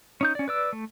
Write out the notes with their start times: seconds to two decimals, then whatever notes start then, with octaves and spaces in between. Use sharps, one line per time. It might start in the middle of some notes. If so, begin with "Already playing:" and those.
0.21 C#4 D#4 G6
0.35 C#4 D5
0.48 B4 D5 E6
0.73 A3